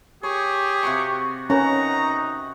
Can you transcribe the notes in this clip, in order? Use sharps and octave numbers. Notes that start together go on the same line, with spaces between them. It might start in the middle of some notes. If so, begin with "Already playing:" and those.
G4 G#4 C#5
C3 F#4 C#6
C#4 D#4 F#4 A#4 B4 A#5